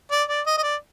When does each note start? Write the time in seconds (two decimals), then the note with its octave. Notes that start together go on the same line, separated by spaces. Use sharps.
0.11 D5
0.29 D5
0.46 D#5
0.58 D#5
0.63 D5